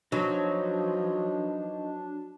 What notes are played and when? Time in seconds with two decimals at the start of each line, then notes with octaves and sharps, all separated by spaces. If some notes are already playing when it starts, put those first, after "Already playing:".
0.12 F3 F#3 D4 D#4 B4 C#5